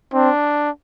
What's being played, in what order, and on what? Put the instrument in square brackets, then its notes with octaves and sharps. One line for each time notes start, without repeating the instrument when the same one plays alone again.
[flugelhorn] C4 [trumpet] D4